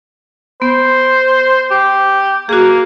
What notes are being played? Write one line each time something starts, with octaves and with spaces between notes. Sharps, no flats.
B3 C5
G4
A#3 F#4 G#4